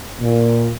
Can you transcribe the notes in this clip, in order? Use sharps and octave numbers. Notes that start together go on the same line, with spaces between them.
A#2